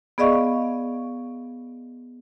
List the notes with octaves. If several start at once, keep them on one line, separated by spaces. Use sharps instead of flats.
B3 G#4 D5 D#5 F5 C#6